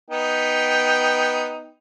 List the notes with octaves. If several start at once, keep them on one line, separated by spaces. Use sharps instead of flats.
B3 D#4 G5